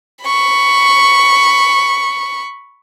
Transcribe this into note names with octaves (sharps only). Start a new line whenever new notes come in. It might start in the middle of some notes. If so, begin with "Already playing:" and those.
B5 C#6